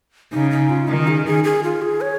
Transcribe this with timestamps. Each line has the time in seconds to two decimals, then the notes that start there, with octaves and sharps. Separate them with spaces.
0.32 C#3 D#4
0.51 D#4
0.69 F4
0.88 D#3 D#4
1.08 G#4
1.26 G#4
1.44 G#4
1.63 F4
1.82 G#4
2.01 C#5